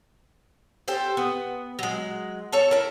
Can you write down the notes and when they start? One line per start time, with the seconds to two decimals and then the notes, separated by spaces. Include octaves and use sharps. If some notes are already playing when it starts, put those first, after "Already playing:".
0.88 G4 A4 C5
1.17 B3
1.79 F#3 G#3
2.52 A4 C#5 A5
2.71 E4 A#4